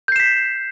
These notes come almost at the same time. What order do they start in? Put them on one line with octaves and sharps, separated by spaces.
G6 C7 E7 B6